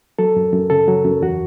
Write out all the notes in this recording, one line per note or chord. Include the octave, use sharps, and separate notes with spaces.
F#3 A4
F#2
F#2
C#3 A4
F#3
F#2
E2 F#4